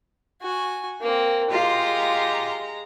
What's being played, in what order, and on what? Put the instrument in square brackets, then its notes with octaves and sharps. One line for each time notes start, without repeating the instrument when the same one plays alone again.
[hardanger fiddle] F#4 G#5
A#3 C4
[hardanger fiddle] G#3 A#5 [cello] F4 G4